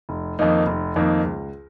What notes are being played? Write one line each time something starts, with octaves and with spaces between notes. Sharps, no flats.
F1
F2 D#3 A#3 D#4
F1
F2 D#3 A#3 D#4
C#2